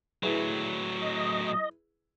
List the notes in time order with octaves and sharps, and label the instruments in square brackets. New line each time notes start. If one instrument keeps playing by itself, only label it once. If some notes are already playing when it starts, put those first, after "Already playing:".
[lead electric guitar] A2 F#3 [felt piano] E4 G#4 B4
[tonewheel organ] D#5